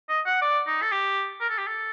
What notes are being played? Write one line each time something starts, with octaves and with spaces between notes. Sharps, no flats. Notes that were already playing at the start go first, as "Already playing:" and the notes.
D#5
F#5
D5
D#4
A4
G4
A#4
A4
G4
A4